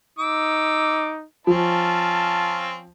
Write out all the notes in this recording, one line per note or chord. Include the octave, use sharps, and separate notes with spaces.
D#4 D6 E6
F3 C4 C#4 F4 A5